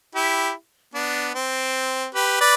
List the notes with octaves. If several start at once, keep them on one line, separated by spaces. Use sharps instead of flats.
E4 G4
B3 D4
C4
G4 B4
B4 D5